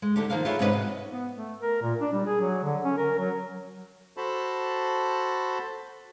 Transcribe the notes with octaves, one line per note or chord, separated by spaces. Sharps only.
G#3
D3 A3 D#4 G4
D#3 F3 A#3 A#4 F5
F4 G4 G#4 B4 C#5 E5
G#2 C3 C#4 F4 B4 D#5
F#4
B3
A3
A#4
A#2
D4
G3
G#4
F#3
D3
C#4
A#4
F#3
F#4 A4 C5 A5 B5